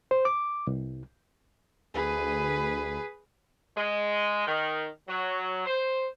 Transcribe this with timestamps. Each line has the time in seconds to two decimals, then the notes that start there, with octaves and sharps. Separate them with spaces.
0.11 C5
0.25 D6
0.67 C2
1.94 D2 G#4 B4
3.76 G#3
4.46 D#3
5.08 F#3
5.65 C5